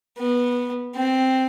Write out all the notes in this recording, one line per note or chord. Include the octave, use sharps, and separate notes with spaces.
B3
C4